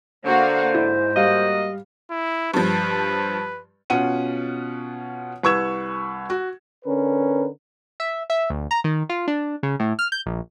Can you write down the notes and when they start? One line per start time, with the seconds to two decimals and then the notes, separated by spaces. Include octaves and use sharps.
0.25 D3 A#3 F#4 C5 F5
0.74 G#2 E4
1.16 G3 A#3 F#4 D#5 F5
2.11 E4
2.54 G2 F3 B4
3.90 B2 C#4 F4 F#5 D#7
5.43 C2 B4 C#6 E6 G#6 E7
6.30 F#4
6.85 D3 C#4 A#4 B4
8.00 E5
8.30 E5
8.50 D2
8.71 A#5
8.84 D#3
9.09 F4
9.28 D4
9.63 C#3
9.80 A2
9.99 F6
10.12 G6
10.26 A#1